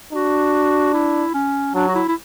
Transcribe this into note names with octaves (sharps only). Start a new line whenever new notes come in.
D4 F#4
E4
C#4
F#3 D4
F#4
E4
E4